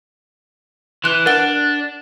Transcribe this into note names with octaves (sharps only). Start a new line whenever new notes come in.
E3 C6 F#6
D4 A#4 F#5 G7